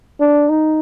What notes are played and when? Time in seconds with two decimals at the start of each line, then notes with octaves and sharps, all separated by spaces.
0.20 D4
0.49 D#4